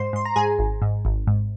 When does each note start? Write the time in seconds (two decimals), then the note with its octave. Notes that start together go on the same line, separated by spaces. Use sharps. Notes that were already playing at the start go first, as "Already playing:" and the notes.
Already playing: G#2 C5 C6
0.13 G#2 C6
0.25 A#5
0.36 G#2 G#4 G#5
0.59 G#1
0.82 G#2
1.05 G#1
1.27 G#2